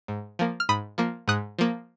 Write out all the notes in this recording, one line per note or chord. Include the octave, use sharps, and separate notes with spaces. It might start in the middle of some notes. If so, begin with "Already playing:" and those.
G#2
F3 A#3
F6
G#2 B5 D#6
F3 A#3
G#2 D#6 F#6
F3 A#3